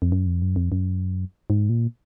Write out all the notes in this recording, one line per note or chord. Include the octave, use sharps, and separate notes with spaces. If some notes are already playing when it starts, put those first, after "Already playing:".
F2
F#2
F2
F#2
F2
F#2
G#2
A#2